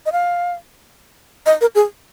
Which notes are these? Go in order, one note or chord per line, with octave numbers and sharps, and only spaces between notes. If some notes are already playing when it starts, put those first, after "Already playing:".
D#5
F5
D#5
A#4
G#4